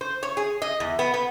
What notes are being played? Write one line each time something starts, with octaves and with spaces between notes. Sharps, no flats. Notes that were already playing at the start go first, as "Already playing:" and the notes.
C5
C#5
G#4
D#5
E2
B3
B3